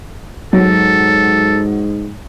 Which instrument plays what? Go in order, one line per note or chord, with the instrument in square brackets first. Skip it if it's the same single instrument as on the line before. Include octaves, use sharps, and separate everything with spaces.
[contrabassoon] G#2 [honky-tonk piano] F#3 [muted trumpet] A4